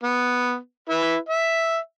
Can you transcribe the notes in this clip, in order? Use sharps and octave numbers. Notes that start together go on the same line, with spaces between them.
B3
E4 B4
E5